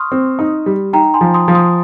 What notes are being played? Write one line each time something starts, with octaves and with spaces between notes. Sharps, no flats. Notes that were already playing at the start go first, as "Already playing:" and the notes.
Already playing: C6 C#6 D#6 F6
C4
D#4
G3
D#4 G5 A#5
G#5 C6
F3
C6 D#6
F3
C6 D#6